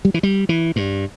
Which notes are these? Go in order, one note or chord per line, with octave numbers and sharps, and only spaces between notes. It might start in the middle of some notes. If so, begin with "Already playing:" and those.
G3
E3
G3
E3
G2